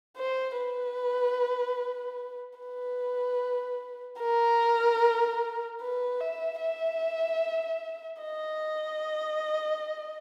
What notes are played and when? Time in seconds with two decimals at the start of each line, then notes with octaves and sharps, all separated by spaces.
0.17 C5
0.58 B4
2.59 B4
4.20 A#4
5.81 B4
6.20 E5
6.61 E5
8.22 D#5